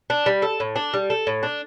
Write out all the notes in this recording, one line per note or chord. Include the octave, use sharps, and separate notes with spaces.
D4
G3
A4
A2
D4
G3
A4
A2
D4